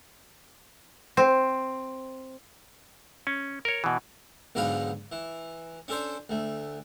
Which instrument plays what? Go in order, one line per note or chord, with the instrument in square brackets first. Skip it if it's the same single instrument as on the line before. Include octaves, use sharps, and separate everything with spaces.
[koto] C4
[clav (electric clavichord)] C#4
A#4 C#5
B2 E3
[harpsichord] B1 G#2 D3 D#4 B4 F5
E3
C#4 D4 A4 C5 D5
D2 A3